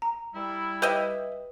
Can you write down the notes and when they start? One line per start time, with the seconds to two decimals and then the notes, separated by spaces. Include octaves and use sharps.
0.02 A#5
0.35 G3 E4
0.82 G4 B4 D#5 E5